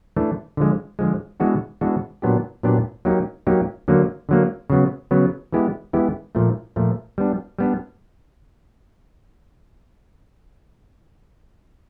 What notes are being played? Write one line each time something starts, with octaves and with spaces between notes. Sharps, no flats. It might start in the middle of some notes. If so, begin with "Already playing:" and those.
E3 A3 D4
D3 F3 G#3
D3 F3 G#3
E3 G#3 B3 D4 F#4
E3 G#3 B3 D4 F#4
A#2 F#3 B3 D4 G4
A#2 F#3 B3 D4 G4
F#3 A#3 D#4 G4
F#3 A#3 D#4 G4
D3 F#3 A#3
D3 F#3 A#3
C#3 F#3 B3
C#3 F#3 B3
E3 G#3 B3 E4 G4
E3 G#3 B3 E4 G4
A#2 F3 A3
A#2 F3 A3
G3 B3 D4
G3 B3 D4